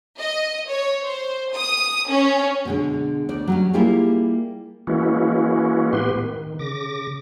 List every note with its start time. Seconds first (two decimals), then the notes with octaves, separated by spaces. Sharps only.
0.20 D#5
0.68 C#5
1.05 C5
1.54 D#6
2.11 C#4
2.65 B2 D3 G#3
3.29 D2 D5
3.48 F#3 G3 C#4
3.74 G3 A#3 E4 F4 G4 G#4
4.87 E3 G#3 A#3 C#4 E4 F#4
5.93 A2 B3 G4 B4 C6
6.22 D#3
6.59 C#3 D6 A#6